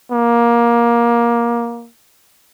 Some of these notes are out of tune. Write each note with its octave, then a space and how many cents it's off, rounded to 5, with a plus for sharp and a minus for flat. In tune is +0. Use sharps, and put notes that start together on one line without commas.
A#3 +20